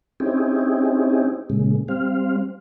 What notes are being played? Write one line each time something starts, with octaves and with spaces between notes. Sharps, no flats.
C4 C#4 D#4 E4 G4 G#4
A#2 C#3 G#3
G3 C4 F5